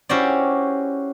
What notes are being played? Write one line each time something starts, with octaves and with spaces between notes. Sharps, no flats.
C#4 E4 F#4 G4 C5 D5